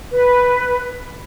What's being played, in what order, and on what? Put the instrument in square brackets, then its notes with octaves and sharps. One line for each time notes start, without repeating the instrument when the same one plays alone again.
[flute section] B4